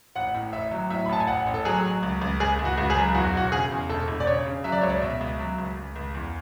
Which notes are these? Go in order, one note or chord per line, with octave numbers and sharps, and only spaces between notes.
A1 F#5
A2
A1 E5
F#3
A2 E5
B5
A1 A5
G#5
A1 F#5
A1
A4
F#3 G#4
F#3
C#2
C#2
C#2 G#4
C#2
F#4
C#2
G#4
F#3
E2 F#4
E1 F#4
C#3 G#4
E2
E1 A4
E1
D5
C#3 C#5
C#3
F#3 E5
D5
C#2 C#5
D5
B2 E5
C#2
F#3
C#2
C#2
C#2
E2